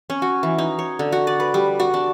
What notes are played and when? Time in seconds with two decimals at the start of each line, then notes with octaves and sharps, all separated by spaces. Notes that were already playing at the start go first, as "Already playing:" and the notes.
0.10 C#4
0.22 F#4
0.43 E3
0.58 D#4
0.79 C#5
0.99 D3
1.12 F#4
1.27 D5
1.40 B4
1.54 G3
1.80 F#4
1.94 D4